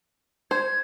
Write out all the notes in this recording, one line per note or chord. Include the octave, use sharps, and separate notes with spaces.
C5 G#6